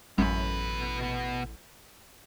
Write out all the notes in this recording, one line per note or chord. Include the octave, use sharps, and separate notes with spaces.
A1 F#2 B2 B4